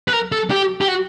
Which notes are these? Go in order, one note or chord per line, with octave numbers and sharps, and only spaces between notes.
B4
A#4
A4
G4
G4
F#4